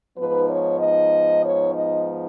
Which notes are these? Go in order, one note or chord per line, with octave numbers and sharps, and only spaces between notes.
G#2 F3 B3 D#4 B4
C#5
D#5
C#5
D#5